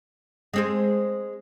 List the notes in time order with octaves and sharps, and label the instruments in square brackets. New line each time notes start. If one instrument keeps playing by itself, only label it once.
[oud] G#3 C4 G#4